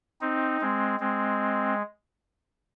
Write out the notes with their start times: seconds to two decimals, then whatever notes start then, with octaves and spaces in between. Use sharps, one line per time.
0.21 C4 D#4
0.61 G#3 C4
0.99 G#3 C4